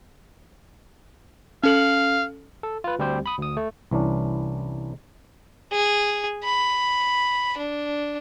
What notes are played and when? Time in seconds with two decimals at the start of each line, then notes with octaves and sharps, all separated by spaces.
1.63 C#4 A4 F5 F#7
2.63 A4
2.84 F4 B4
2.99 D2 G3 C4 G4 C5
3.26 B5 D#6
3.38 D2 D#6
3.57 A3
3.91 C2 E3 C#4 D4
5.72 G#4
6.44 B5
7.58 D4